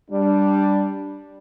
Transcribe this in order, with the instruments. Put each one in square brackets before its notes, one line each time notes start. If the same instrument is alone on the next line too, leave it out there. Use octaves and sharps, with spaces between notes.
[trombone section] G3 D4